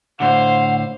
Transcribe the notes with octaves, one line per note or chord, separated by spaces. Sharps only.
A2 D3 C5 F5 F#5